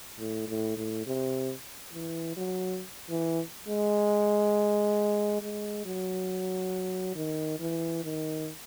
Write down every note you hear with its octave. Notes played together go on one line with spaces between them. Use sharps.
A2
A2
A2
C3
E3
F#3
E3
G#3
G#3
F#3
D#3
E3
D#3